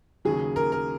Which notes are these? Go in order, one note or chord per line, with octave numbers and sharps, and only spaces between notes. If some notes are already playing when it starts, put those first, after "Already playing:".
D#2 C#3 F#3 G#4
A#4
A#4